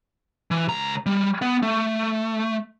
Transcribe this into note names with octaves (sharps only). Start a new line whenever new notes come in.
E3
C#2 A#5
G3
B3
A3